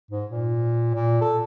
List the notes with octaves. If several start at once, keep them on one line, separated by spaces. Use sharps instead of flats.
G#2
A#2
A#2
A4